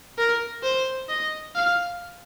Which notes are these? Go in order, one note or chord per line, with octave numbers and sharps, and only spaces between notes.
A#4
C5
D#5
F5